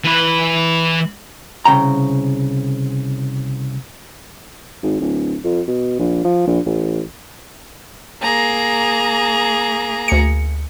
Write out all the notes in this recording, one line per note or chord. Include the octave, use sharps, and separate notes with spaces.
E3 B4
C2 C#3 G5 A#5
G#1
D1
F2
B2
A#1
F3
A#1
A1
A#3 G#4 A#5
D2 C#7